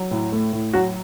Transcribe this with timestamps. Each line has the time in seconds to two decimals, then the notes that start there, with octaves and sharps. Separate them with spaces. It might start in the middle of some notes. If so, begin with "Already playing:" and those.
Already playing: F#3
0.11 A2
0.32 A3
0.53 A2
0.73 F#3 F#4